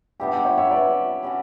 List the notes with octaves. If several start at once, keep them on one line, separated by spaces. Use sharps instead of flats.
G3 B3 D4 G4 E5 G5
E5 G5
C#5 E5
C#5 E5
B4 D5
G3 C#4 F#4